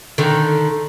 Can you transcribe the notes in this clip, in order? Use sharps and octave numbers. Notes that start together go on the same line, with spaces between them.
D3 D#3